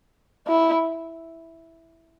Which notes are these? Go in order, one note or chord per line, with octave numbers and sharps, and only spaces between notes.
E4